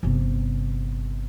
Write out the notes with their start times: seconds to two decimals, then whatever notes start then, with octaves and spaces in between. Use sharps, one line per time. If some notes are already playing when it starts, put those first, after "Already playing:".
0.03 G1 C3